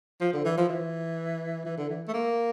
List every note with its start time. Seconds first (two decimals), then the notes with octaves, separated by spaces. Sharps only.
0.21 F3
0.33 D3
0.45 E3
0.57 F3
0.69 E3
1.65 E3
1.78 D3
1.89 E3
2.08 A3
2.13 A#3